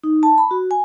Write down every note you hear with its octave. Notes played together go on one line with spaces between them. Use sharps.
D#4
A5
B5
F#4
G#5